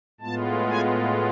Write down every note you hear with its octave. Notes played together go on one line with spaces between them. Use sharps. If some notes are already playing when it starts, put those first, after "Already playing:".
A2 G#3 B3 F4 A5
G#5